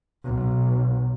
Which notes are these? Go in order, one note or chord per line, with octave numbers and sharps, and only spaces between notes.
B1